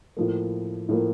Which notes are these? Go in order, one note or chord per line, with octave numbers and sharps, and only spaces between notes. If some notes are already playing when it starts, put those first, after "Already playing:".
A2 F3 A#3
A2 F3 A#3